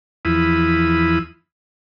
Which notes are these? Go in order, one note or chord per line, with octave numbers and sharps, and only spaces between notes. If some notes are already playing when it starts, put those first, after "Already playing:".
E2 F3 E4 B5 D#6